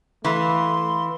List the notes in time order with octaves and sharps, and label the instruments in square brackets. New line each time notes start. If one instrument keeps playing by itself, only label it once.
[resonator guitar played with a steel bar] E3 [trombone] A3 [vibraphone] F5 B5 [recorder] C6